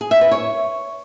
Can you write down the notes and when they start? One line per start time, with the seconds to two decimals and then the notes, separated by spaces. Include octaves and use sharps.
0.01 G#4
0.11 E5
0.21 B4
0.31 C#5